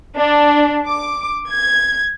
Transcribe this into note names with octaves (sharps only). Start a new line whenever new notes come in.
D4
D6
G#6